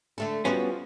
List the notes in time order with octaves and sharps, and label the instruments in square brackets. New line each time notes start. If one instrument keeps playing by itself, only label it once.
[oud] D3 A3 A4
[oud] F3 F#4 [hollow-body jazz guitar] G3 B3 C#4